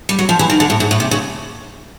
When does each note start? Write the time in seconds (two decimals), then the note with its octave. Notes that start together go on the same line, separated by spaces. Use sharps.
0.09 G3
0.19 F#3
0.29 F3
0.39 E3
0.50 D#3
0.60 D3
0.70 A2
0.80 G#2
0.91 A2
1.00 C3
1.11 C#3